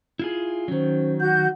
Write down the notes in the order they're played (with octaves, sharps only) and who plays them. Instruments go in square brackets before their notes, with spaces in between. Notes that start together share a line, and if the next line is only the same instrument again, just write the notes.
[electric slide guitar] E4 F4 G#4
[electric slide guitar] D#3 F#3 [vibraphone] C#4 C5
[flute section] F#4 G6 [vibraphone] F#5